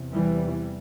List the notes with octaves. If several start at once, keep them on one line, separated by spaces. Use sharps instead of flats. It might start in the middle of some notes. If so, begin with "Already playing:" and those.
Already playing: E2 C3
E3 G3